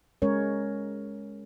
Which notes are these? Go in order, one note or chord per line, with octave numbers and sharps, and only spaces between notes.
G#3 C#4 A#4 C#5